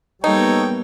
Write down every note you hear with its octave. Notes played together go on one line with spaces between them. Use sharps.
G3 A#3 B3 D#4 A4 C#5 G5